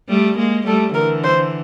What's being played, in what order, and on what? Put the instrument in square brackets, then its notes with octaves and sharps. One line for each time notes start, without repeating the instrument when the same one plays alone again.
[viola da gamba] G3 A3
G#3 A#3
[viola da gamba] G3 A3 [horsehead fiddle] A4
[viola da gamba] D3 E3 [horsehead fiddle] A#4
[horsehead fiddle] C5